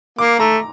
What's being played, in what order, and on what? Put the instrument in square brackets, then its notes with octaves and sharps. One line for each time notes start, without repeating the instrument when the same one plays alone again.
[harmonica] A#3 [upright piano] D6
[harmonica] A3 [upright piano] A#5